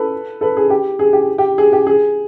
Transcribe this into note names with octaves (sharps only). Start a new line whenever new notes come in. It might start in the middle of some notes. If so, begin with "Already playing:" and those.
Already playing: A4 B4
A4 B4
G#4
G4
G#4
G4
G4
G#4
G4
G#4